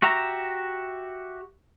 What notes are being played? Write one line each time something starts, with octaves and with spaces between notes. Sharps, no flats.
F#4 G4 E5 A#5